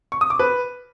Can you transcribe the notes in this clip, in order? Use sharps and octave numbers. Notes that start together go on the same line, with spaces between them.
C#6
D#6
D6
B4